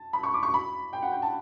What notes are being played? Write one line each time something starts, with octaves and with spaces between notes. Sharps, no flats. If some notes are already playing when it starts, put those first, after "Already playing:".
Already playing: A5
B5
C#6
D6
C#6
B5
G5
F#5
G5
A5